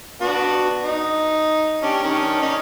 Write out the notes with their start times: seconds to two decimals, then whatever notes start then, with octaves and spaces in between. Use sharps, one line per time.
0.21 B3 D4 F#4
0.83 D#4
1.83 C#4 D4 G4
2.03 D#3 C#4 D4
2.42 C#4 D#4